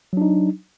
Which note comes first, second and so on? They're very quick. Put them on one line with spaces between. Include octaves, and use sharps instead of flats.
F#3 D4 D#4